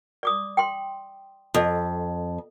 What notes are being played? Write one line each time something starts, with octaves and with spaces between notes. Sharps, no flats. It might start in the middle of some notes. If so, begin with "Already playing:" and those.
D5 D6 D#6
G5 C6
F2 A4 D#5